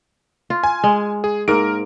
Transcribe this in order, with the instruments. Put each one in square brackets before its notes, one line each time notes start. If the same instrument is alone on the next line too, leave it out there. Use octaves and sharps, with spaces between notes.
[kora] F4
[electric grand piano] G#5
[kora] G#3
[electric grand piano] G#4
[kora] G#2 A#3 [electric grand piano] A#4 D7